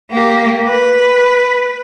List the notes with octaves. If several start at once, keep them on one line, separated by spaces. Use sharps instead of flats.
A#3 G4
B4